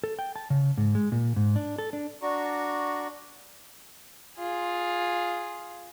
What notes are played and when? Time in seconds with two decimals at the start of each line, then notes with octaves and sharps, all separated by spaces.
0.04 A4
0.19 G5
0.36 A5
0.50 C#3
0.77 G#2
0.95 G#3
1.12 A#2
1.36 G#2
1.56 D4
1.79 A4
1.93 D4
2.22 D4 F#4 D5 A#5 C#6
4.38 F4 G#4